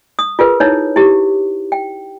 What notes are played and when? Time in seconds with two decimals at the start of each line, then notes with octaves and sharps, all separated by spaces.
0.19 D#6
0.39 F4 G#4 A#4 B4
0.60 D#4 E4 C#5
0.96 E4 G4
1.72 G5